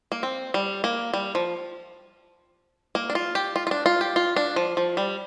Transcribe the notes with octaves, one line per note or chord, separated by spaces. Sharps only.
A#3
C4
G3
A#3
G3
F3
A#3
D4
F4
G4
F4
F4
D4
F4
G4
F4
D4
F3
F3
G3